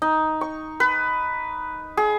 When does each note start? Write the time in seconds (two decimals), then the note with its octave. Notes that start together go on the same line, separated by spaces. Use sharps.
0.02 D#4
0.41 C#6
0.80 B4
1.97 G#4